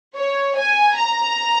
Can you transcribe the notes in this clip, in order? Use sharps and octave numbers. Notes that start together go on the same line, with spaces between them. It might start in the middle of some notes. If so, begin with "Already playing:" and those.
C#5
G#5
A#5